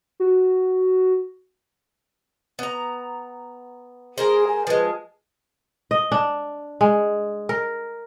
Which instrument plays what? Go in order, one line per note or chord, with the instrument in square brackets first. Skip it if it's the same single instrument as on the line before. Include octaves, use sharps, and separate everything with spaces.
[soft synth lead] F#4
[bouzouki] B3 A#5
[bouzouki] G#3 A#4 C5 [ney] G#4
[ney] G#5
[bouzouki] F3 G#3 [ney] B4
[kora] D#5
D4
G#3
A#4